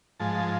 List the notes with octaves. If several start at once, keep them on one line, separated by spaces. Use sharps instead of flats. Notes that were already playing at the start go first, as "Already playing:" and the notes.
G#2 F3 G#3 A5